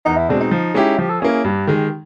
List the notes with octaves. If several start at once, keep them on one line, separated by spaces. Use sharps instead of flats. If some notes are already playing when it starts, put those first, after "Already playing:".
E2 D#4
E4
B2 G#3 C4 D4
D#4
F3
G#3 C#4 E4 G4
F3 G4
A4
A#3 C#4 E4 G#4
G#4
G2 G4
D#3 G#3